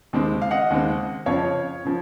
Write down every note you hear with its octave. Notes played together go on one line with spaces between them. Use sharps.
D#2 C#3 G#3 C4
F5
D#5 F#5
D#2 C#3 G#3 C4
F2 C#3 F3 C#5 F5
C#3 F3